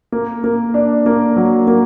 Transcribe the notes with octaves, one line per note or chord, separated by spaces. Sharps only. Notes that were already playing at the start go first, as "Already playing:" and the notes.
A#3
A#3
D4
A#3
F#3
A#3